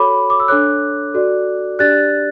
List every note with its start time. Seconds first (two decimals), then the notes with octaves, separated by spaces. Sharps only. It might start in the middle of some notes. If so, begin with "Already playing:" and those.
Already playing: F#4 A4 C#5 B5 D6
0.30 D6
0.40 E6
0.48 D4 A4 C#5 D6 F#6
1.14 F#4 A4 D5
1.79 D4 G4 D5 F#6 A6